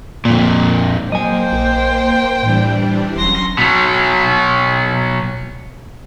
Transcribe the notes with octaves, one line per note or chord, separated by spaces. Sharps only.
F2 A#2
F#3 A#3 C5 D#5 G5 G#5
A#1
A2 E3 G3 D4
E1 F#3 C#4 C6 A#6
B2 F#3